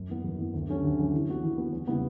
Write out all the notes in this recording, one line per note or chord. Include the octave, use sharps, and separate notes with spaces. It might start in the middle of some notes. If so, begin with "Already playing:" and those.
Already playing: F#2
E3 B3
F#2
E3 B3
D2
D3 F#3 C#4 G4
D2
D3 F#3 C#4 G4
E3
B3 F#4
E3
B3 F#4
E2
C#3 G3 B3 E4